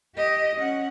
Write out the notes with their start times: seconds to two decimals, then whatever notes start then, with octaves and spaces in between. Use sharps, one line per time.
0.16 G4 D#5
0.56 C#4 F#5